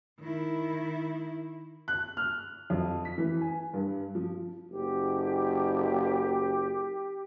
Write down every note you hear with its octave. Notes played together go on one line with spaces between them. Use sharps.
D#3 E4
F#6
F6
F2
B6
E3
G#5
G2
F3
F#1 G4